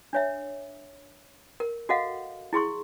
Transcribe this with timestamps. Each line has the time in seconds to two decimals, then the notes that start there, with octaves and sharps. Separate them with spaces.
0.13 D4 C#5 E5
1.60 A#4
1.89 F#4 A4 D#5 F5 F#5
2.53 E4 G#4 C6 C#6